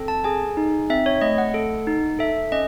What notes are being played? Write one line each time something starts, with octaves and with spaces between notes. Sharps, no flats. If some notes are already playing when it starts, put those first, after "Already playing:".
Already playing: C4 A4
A5
G#4 G#5
D#4
C4 E5
C#5
A3 D#5
F#5
A4
D#4
A4 E5
C#4 D#5